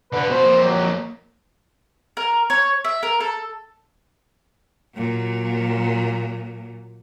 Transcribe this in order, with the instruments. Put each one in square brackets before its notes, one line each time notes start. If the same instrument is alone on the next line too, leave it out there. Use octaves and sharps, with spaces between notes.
[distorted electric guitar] D3 B3 [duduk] B4
[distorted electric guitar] B2 F#4 [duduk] C5
[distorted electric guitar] F2 A#3
[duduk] F#3
[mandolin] A#4
C#5
E5
A#4
A4
[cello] A#2 F#3